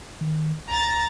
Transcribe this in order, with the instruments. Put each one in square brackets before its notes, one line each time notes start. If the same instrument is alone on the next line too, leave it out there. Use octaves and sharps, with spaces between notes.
[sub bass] D#3
[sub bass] C#2 [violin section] A#5 A6